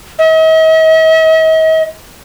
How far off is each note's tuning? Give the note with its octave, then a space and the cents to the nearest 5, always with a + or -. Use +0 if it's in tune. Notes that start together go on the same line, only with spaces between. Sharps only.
D#5 +45